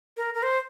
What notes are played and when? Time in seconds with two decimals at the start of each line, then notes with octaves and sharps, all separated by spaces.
0.17 A#4
0.34 A#4
0.43 C5